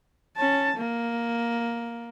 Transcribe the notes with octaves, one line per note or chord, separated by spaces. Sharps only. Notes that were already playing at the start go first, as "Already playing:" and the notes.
C#4 A5
A#3